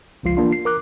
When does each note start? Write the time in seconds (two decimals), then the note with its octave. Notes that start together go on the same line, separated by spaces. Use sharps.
0.23 G1 C#2 F3 F4 C7
0.37 E3 A#3 D4 F4
0.53 C7
0.65 A#4 D6 F#6